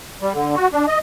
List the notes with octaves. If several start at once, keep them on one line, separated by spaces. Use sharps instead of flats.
G3
D3
F#4
D4
D#5